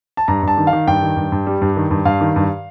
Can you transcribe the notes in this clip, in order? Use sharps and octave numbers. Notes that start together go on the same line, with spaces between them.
A5
G2 A#5
G2 A5
D#3
F5
D#3
G2 G5
D#3
G2
G2
G3
G2
D#3
G2
G2 F5
D#3
G2